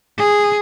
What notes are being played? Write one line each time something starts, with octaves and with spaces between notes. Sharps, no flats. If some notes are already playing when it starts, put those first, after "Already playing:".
G#4